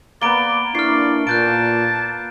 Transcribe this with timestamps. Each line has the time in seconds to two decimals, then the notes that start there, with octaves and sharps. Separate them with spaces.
0.22 A#3 B3 D5 A#5 D7 G7
0.75 A#3 D4 E4 D5 C#6 F6 C7
1.27 A#2 A5 F#6 G6 D7